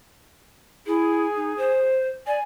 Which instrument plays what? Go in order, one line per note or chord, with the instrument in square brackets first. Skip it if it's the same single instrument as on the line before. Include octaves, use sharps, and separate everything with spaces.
[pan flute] E4 [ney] G#4
[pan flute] D#4
C5
[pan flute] D5 [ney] G#5